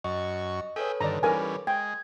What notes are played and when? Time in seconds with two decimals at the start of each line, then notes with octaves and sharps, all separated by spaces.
0.04 F#2 F#4 D#5 C#6
0.76 G#4 A4 B4 C#5 E5 G5
1.01 G2 D3 D#3 D5 A#5
1.23 E3 G3 C#4 A#4 G#5
1.67 G#3 G5 G#6